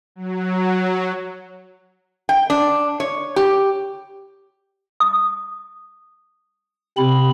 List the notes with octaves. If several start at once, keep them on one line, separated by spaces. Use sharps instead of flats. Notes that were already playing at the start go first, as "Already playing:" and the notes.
F#3
G5
D4
C#5
G4
D#6
C3 C4 B5